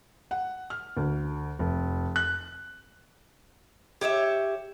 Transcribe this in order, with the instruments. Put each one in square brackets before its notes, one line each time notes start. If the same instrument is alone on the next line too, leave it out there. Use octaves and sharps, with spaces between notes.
[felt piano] F#5
F6
D2
F1
F#6
[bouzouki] G4 C#5 D#5 E5